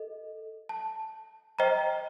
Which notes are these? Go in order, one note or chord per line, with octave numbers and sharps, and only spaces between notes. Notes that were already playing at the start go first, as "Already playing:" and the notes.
Already playing: A4 D#5
A5
C5 D#5 G5 A#5